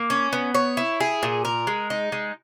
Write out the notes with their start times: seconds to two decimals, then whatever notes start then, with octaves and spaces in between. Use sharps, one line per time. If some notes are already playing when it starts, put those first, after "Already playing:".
Already playing: A#3
0.10 C#4
0.33 B3
0.54 C#5
0.77 E4
1.00 G#4
1.23 A#2
1.45 A#4
1.67 G#3
1.90 D#4
2.12 G#3